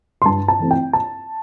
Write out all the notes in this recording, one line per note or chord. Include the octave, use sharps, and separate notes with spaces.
C6
G2 A5
A5
E3 A3 C4
G5
A5